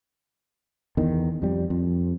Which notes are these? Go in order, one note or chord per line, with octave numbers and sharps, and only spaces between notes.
E2 D#3
F2 G3
F2